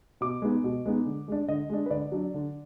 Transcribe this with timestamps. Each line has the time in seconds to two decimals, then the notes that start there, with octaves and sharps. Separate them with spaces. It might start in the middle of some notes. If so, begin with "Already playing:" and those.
0.21 B2 D6
0.42 G#3 B3 D#4
0.64 B2
0.85 G#3 B3 D#4
1.06 D3
1.28 G#3 D4
1.48 D3 D#5
1.70 G#3 D4
1.86 B4
1.90 D3 D5
2.12 F#3 D4
2.34 D3